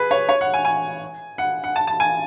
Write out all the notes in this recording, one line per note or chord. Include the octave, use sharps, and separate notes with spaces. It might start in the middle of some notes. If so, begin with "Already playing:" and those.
Already playing: G#4 B4
C#5
C#5
F#5
G#5
G#5
F#5
F#5
A5
A5
G#5